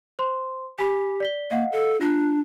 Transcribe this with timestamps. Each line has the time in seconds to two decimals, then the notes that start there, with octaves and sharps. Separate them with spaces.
0.19 C5 C6
0.79 G4 G#5 B5
1.20 D5 B6 G7
1.51 A#3 D#5 F5 F#5
1.72 A4
2.01 D4 F4 F#6